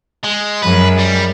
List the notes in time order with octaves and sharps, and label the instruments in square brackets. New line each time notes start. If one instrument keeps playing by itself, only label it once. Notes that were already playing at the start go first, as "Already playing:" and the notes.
[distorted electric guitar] G#3
[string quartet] F#2 G#3 A#4 [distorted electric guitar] B4
[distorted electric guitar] G3